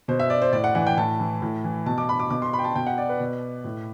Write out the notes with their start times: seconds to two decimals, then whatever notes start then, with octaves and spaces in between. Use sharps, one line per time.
0.08 B2 C5
0.20 E5
0.30 D5
0.42 C5
0.53 A2 D5
0.64 F#5
0.75 E3 F#5
0.87 G5
0.97 A2 A5
1.19 E3
1.42 A2
1.64 E3
1.86 B2 A5
1.98 D6
2.09 B5
2.20 D6
2.30 B2 D6
2.42 C6
2.53 B5
2.59 G5
2.64 A5
2.75 B2 G5
2.87 F#5
2.98 D5
3.09 B4
3.20 B2
3.64 A2